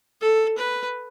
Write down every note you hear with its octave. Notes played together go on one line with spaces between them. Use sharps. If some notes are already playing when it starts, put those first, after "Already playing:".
A4
B4